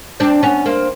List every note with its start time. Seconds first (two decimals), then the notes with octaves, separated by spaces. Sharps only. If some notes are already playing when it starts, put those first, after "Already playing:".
0.20 C4 D4
0.43 B3 C#4
0.66 A#3 C4